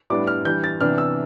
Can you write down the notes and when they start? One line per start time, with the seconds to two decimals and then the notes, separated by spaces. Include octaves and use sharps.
0.10 A2 G3 B3 D4 D6
0.27 F6
0.45 E3 G3 D4 G6
0.64 A6
0.80 C3 E3 B3 D4 F6
0.98 E6